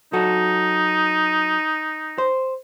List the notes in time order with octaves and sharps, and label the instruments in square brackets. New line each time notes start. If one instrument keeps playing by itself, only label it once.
[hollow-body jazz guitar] F#3 F#4 A4 [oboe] D#4
[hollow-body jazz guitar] C5